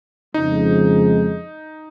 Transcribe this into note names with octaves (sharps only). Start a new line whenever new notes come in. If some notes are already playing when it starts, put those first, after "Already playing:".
F2 C#3 F3 G#3 D#4